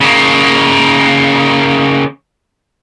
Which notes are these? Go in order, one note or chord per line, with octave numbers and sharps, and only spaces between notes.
C#3 A#3